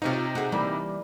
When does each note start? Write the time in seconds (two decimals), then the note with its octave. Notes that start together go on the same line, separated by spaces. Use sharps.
0.02 C3 D#4 F4 C#5 F5
0.35 F#4 G#4
0.52 E3 G3 A#3